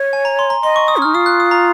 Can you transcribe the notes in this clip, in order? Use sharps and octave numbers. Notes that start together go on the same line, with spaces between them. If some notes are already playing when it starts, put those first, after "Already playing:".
Already playing: C#5
G#5
A#5
C6
A#5
D#5 C6
C#6
D#6
C#4
D#4 F6
F4 D#6
F#6
D#6
A#5